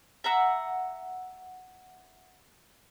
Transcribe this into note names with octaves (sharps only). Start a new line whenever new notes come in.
E5 F#5 A#5 E6